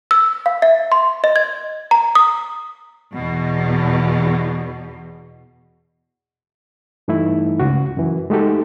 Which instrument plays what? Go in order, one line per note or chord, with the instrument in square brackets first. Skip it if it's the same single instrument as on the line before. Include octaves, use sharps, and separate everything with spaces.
[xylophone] E6
F5
E5
C6
D#5
G#6
A#5
D#6
[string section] E2 B2
[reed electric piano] G2 E3 A3 D#4 E4
C#2 C#3 F#4
F#2 E3
G#3 A3 D#4 F#4 G4 A4